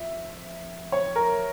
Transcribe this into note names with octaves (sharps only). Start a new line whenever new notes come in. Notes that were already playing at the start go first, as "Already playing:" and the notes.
Already playing: F2 E5
C#5
A#4